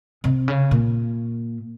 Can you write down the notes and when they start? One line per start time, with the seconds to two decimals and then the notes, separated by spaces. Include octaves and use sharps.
0.24 C3
0.48 C#3
0.71 A#2